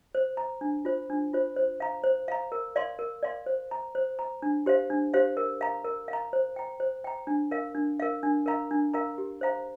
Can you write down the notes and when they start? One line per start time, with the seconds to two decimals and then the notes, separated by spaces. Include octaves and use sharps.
0.15 C5
0.37 A#5
0.61 D4
0.85 F4 C5
1.10 D4
1.33 F4 C5
1.56 C5
1.80 F5 A#5
2.04 C5
2.28 F5 A#5
2.52 A#4
2.76 D5 F5 C6
2.99 A#4
3.23 D5 F5 C6
3.46 C5
3.71 A#5
3.95 C5
4.19 A#5
4.42 D4
4.66 G4 C5 F5
4.90 D4
5.14 G4 C5 F5
5.37 A#4
5.61 F5 A#5
5.85 A#4
6.08 F5
6.13 A#5
6.33 C5
6.56 G5 A#5
6.80 C5
7.04 G5 A#5
7.27 D4
7.51 A#4 F5
7.75 D4
8.00 A#4 F5
8.23 D4
8.46 A#4 F5 A#5
8.71 D4
8.94 A#4 F5 A#5
9.18 G4
9.41 C5 F5 A#5